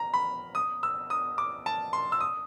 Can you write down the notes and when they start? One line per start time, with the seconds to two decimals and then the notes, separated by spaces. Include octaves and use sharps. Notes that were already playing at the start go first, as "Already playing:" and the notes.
Already playing: A#5
0.14 B5
0.55 D#6
0.83 E6
1.10 D#6
1.38 D6
1.66 A5
1.93 C6
2.12 E6
2.21 D#6